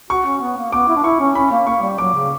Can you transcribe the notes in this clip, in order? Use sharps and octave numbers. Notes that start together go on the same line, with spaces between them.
F#4 C#6
C#4
B3
A#3
B3 D6
E4
D4
E4 C#6
C#4
C#4 B5
A#3
A#3 C#6
G3
F#3 D6
C#3